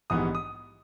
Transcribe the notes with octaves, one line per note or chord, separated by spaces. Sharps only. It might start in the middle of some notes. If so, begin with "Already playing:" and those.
A#1 G#2 E3 G3 B3 D#6
D#6